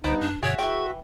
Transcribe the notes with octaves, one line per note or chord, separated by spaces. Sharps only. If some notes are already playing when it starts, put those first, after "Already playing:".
C#2 G2 D3 B3 D#4 B4 C5
F#2 D4
G2 B2 D3 F#4 G#4 C#5 E5
E3 G#4 G5 C#6